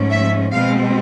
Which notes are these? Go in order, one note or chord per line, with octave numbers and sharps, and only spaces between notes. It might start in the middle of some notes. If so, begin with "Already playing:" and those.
Already playing: G#2 F3 A3 C#4
E5
B2 G#3 C4 F5